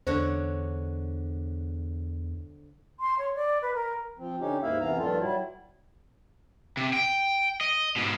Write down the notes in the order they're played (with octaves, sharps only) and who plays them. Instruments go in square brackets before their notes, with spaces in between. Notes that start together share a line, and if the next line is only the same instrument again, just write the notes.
[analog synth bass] E2 [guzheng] D3 F#4 C#5 [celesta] C5
[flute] C6
C#5
D5
B4
A#4
[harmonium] F3 C4
D3 C#4 D#4 G4
D#2 G#2 A#3 E4 E5 F5
F#2 C3 E3 B3 F5 A#5
G2 A#2 D#3 F3 F4 A4
F#3 G3 E4
[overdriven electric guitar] C3
G5
D#5
G#2 B2